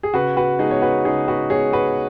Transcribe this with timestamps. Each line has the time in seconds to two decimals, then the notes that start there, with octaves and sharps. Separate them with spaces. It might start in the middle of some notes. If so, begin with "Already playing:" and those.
0.03 G#4
0.14 C#3 F#4 B4
0.37 F#4 B4
0.59 G#3 B3 D#4 G#4
0.71 C#5
0.82 F#4 B4
1.05 C#3 D#4 G#4
1.28 F#4 B4
1.50 G#3 B3 G#4 C#5
1.73 F#4 B4